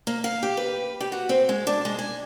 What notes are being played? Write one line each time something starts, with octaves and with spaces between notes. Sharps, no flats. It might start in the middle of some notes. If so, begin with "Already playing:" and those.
A#3
F5
G4
B4
G4
F#4
C4
G#3
D4
G#3
G#5